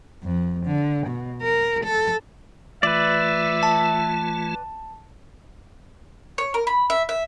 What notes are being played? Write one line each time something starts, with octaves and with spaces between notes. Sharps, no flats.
F2
D3
B2
A#4
A4
E3 A3 F4 B4 D5 E5
A5
C#5
A#4
B5
E5
E5